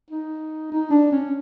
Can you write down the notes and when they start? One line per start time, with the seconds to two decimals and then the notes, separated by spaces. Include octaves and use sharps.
0.11 D#4
0.72 D#4
0.91 D4
1.12 C#4